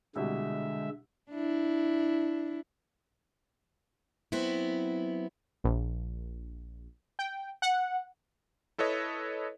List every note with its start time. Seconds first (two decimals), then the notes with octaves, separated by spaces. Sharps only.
0.16 C2 B2 D3 G3 G#3 E5
1.30 D4 E4
4.32 F#3 B3 C4 E4
5.64 A#1
7.19 G5
7.62 F#5
8.78 E4 A4 B4 C#5 D#5